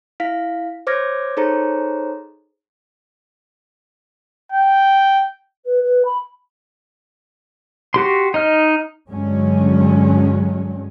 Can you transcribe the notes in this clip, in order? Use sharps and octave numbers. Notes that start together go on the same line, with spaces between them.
E4 F5 B6
C5 C#5 D6 F6 G#6 A#6
D#4 G#4 A4 C5 C#5 A#5
G5
B4
B4
B5
F#4 G4 C6
D#4 D#5 F6
G2 D3 F#3 G#3 C#4